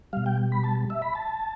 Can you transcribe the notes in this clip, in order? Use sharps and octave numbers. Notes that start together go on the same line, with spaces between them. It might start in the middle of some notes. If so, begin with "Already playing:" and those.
B2 G3 F5
G5
B5
A5
E5
B5
A5